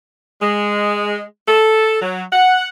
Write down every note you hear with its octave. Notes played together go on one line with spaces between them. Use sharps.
G#3
A4
F#3
F#5